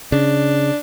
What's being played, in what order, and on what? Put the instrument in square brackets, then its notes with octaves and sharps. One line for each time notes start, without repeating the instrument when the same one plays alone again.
[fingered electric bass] C#3 [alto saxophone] D4